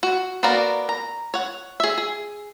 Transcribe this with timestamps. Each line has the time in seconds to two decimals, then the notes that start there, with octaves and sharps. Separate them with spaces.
0.03 F#4
0.43 A#3 B3 F#4 A#4 D5
0.89 A#5
1.34 C#5 F#5
1.80 G#4 E5
1.98 G#4